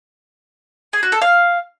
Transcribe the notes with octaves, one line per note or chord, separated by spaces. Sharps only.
G#4
F#4
A4
F5